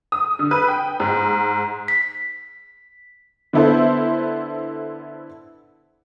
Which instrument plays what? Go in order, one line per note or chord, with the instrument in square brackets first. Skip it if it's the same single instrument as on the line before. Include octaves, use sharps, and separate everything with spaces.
[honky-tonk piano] D#6
D3
B4
G5
G#2
[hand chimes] B6
[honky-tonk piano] D3 B3 E4 A4 C5